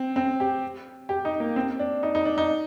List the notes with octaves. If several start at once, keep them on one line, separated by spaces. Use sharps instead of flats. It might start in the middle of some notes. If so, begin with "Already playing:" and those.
Already playing: C4
C4
G4
G4
D#4
A#3
C4
D4
D#4
D#4
D4
D#4